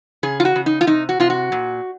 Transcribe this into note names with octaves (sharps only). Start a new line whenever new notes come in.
C#3 G#4
F4
F#4
C#3
D#4
F4
C3 D#4
F#4
C3 F4
F#4
A#2